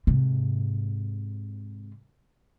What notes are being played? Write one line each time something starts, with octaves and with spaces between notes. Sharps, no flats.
G#2 C3